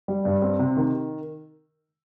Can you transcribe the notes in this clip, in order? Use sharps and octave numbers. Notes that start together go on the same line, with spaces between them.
G3
G2
C4
C3
D#3